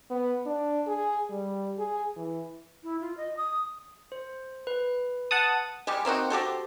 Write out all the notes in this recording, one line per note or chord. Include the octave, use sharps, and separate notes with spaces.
B3
D4
G#4
G3
G#4
E3
E4
F4
D#5
D#6
C5
B4
F#5 A5 D#6
G3 G#3 G4
A#3 C4 D#4 F#4
F#4 G4 A4 C5